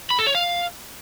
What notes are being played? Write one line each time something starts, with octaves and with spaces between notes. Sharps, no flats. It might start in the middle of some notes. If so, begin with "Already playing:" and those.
B5
A4
C#5
F5